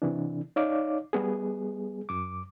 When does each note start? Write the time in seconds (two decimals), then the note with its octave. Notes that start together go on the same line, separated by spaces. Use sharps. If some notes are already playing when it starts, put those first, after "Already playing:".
0.02 C3 E3 D4
0.56 D#4 C#5 D5 F5 D6
1.13 G3 B3 G#4
2.09 F#2 D6